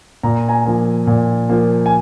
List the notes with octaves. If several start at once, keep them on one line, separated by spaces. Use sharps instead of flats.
A#2 A#5
G#5 A#5
F3 A#3
A#2
F3 A#3
G#5